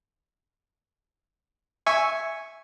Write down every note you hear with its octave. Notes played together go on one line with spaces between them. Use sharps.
E5 G#5 C#6